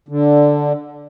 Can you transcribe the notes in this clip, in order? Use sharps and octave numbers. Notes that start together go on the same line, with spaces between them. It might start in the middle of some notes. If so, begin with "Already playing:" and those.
D3